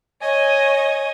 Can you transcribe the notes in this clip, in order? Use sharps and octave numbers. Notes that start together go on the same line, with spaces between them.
C#5 D#5 G#5